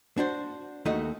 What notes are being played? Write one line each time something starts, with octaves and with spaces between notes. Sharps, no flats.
D4 F#4 C5
D#2 A3 D#4 F#4 D#5